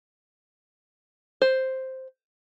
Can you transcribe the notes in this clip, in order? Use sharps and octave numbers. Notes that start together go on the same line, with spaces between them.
C5